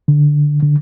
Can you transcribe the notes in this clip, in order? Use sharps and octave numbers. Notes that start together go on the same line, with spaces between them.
D3
D3